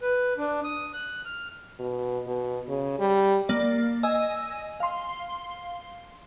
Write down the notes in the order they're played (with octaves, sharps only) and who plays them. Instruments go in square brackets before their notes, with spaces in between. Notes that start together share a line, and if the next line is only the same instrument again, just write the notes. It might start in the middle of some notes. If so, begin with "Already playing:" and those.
[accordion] B4
D4
D#6
F#6
F6
[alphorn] B2
B2
C#3
G3
[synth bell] A#3 D5
D#5 G#5 E6
F5 C6